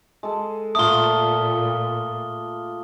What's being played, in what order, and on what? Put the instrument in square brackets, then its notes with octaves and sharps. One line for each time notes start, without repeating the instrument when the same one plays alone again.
[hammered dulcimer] G#3 A4
[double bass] A#2 [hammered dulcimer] A3 A#3 F4 [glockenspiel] D#6 G7